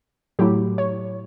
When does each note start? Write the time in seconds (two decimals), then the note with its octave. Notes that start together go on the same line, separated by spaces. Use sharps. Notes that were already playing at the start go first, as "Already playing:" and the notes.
0.39 A2 F#3 A3 E4 G4
0.78 C#5